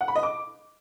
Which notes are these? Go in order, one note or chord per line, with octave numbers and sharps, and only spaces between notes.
F#5
B5
D#5
D6